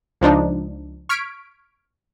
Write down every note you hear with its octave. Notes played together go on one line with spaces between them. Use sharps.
C#2 F3 D4 D#4
C#6 F6 G#6 B6 D7